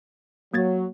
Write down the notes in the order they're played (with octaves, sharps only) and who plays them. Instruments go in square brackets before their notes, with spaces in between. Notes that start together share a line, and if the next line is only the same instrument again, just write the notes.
[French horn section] F#3 [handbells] A#3 G#6 A6